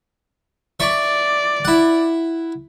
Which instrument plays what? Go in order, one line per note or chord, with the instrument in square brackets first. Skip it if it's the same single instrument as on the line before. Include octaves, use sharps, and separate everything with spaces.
[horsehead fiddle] D5 [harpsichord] E5 C#6
[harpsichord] E4 F#5